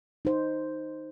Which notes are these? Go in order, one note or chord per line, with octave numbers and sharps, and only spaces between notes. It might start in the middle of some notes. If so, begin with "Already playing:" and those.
D#4 C5